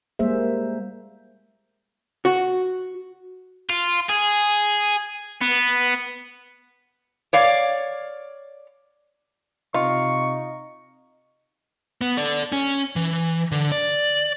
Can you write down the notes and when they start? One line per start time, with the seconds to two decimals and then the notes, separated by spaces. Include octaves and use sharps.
0.19 G3 G#3 A#3 G#4 C5 E5
2.25 F#4
3.70 F4
4.10 G#4
5.41 B3
7.33 C#5 D5 F5
9.74 C3 D#4 F4 C#6
12.01 B3
12.17 A4 D5
12.52 C#4
12.96 E3
13.52 D3
13.72 D5